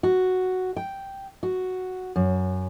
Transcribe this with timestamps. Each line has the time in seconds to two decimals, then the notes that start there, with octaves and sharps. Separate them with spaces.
0.03 F#4
0.76 G5
1.43 F#4
2.16 F#2